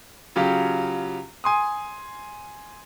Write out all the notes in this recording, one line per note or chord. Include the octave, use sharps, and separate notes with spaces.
C#3 F#3 F4 G4
G#5 C6 D#6